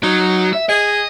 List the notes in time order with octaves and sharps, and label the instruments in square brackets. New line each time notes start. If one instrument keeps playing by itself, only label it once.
[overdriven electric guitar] F#3 [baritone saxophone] D#4
[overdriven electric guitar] E5
[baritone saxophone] G#4 [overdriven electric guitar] D#5